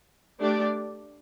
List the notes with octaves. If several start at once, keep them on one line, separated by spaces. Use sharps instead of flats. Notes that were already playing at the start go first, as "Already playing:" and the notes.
A3 D4 G4 D5